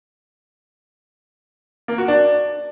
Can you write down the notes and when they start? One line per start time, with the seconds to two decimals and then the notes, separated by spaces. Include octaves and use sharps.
1.88 A#3
1.98 F#4
2.08 D4